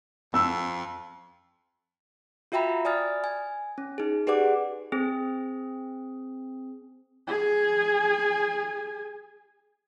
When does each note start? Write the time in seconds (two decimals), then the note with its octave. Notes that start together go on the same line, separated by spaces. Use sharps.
0.34 F2 E6
2.52 F4 F#4 E5 G5 A#5 B5
2.85 D5 G#5 D#6 F6 A6
3.24 G#5
3.78 C#4
3.98 D#4 G#4
4.27 G4 G#4 B4 D5 F#5 D6
4.92 C4 G#4
7.28 G#4 G#5